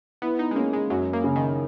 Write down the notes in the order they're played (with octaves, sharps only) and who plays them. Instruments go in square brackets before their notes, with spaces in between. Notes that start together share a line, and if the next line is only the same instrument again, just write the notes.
[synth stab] B3 [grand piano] E4
[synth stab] D#4
G#3
[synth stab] A#3 [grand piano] C#4
[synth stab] G#3
[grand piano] F#2 [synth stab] F#3
[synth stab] A#3
[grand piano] C#3
[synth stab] D#3